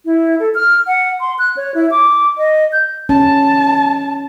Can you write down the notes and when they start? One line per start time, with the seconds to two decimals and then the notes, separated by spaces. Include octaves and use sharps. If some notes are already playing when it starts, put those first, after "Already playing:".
0.05 E4
0.40 A4
0.55 F6
0.87 F#5
1.20 C6
1.39 F#6
1.57 C#5
1.74 E4
1.91 D6
2.38 D#5
2.72 G6
3.09 C#4 A5